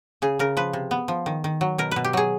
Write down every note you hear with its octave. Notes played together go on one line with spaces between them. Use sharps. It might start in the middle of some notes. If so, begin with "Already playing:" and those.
C#3 G#4
C#3 A#4
F3 B4
C3
B3
F3
D#3
D#3
F#3
B2 A#4
B2 B4
G4
F#3 G#4